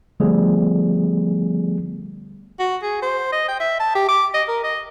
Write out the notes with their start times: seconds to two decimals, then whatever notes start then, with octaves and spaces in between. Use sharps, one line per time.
0.20 D3 F3 G3 A3 B3 G#4
2.59 F#4
2.82 G#4
3.02 C5
3.32 D#5
3.48 G5
3.60 E5
3.80 A5
3.95 G4
4.08 D6
4.34 D#5
4.48 A#4
4.64 D#5